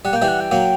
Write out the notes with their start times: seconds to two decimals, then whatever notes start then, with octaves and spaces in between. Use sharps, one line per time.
0.05 G3 F#5
0.13 A#3 G5
0.22 E3 G3
0.28 F#5
0.40 G5
0.51 F#3 A#3